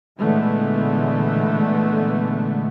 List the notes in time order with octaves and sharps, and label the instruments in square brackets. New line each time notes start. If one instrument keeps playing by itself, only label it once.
[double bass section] A#2 D3 E3 G#3 A3 B3